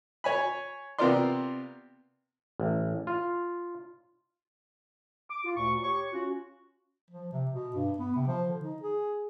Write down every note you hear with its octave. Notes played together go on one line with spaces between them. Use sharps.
C#5 G#5 B5
C3 B3 F4 A#4 D5 C6
A1
F4
D6
F4
D2 A#2 C#6
G4 C#5 C#6
C#4 F4 F#4
F3
C3
B2
G2
B3
C3
F3
D3
D#4
G#4